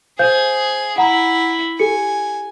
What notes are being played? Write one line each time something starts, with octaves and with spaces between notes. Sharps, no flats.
G#4 C5 F5 G6
E4 F#5 A#5
G4 A4 G#5 C#7